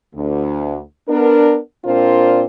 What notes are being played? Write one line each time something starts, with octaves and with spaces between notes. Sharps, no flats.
D2
B3 D4 A#4
A#2 C4 D4 F4 A#4 C5